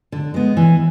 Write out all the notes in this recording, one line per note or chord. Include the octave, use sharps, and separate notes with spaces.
D3
G#3 B3
E3